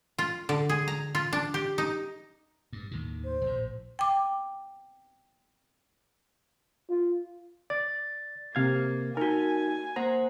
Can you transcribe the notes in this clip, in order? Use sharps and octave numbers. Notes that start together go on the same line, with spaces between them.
F4
D3
G#4
A#5
F4
D4
G4
D#4
G2
D#2 A2 D#3
C5
A#1 A2
G5 D6
F4
D5 A6
C3 A#3 F5 G#6
D#4 F#4 A#4 G#5
A#3 C5 F#5 A#5